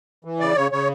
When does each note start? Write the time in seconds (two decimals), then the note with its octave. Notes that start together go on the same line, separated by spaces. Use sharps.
0.25 E3
0.40 C#3 D5
0.56 C#3 C#5
0.72 C#3 C#5